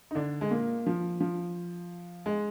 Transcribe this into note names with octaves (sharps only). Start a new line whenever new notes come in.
D#4
D3 D4
G#3
A#2 A#3
F3
F3
G#3